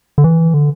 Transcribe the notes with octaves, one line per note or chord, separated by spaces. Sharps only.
D3
E3
D3